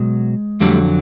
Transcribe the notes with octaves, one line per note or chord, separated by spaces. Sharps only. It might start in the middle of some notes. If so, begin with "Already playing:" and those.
Already playing: B2 F#3 G#3
F2 D3 F#3 G3 A3